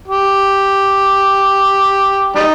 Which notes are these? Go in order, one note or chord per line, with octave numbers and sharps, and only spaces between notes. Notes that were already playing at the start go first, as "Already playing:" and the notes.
G4
G3 D#4